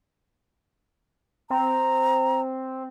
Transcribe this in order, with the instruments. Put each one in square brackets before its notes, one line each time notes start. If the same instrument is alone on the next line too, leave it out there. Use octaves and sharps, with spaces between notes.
[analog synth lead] C4 [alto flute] A#5